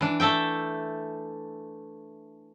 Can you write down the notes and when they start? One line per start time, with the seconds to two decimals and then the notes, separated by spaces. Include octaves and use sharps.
0.01 E3 D4
0.20 A3 A4 E5 G5